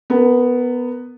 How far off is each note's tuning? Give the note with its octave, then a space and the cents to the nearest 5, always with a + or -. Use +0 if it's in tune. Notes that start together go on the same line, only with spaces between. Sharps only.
B3 +0 A#4 -20